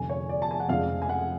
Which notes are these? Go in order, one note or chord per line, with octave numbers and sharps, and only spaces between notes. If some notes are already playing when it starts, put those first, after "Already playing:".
Already playing: F1 F2 D3 G#5
C#5
D5
A5
G#5
F#5
F1 F2 C#3 G#3 D4 F5
G#5
F#5